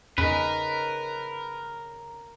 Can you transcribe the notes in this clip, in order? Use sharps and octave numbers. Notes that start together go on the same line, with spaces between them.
E2 C#3 D#4 A#4 B4